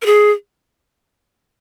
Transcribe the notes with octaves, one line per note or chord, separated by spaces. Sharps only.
A#4
G#4